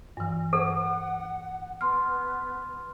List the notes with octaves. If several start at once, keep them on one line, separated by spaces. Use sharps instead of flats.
G2 E3
A4 F#5
B3 C6 F6